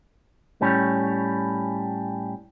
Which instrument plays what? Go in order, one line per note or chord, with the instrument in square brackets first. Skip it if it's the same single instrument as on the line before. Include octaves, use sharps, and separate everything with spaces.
[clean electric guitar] A2 G3 C#4